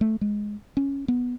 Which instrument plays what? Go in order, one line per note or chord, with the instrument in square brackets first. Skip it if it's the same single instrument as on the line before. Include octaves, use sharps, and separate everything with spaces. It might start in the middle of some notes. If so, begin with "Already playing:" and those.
[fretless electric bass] A3
G#3
C#4
B3